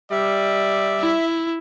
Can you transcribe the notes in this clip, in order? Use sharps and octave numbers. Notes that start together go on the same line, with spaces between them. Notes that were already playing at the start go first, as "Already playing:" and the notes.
G3 D5 E5
E4